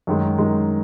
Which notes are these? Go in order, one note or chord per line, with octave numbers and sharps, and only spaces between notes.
F#2 D#3 G#3
F#2 D#3 G#3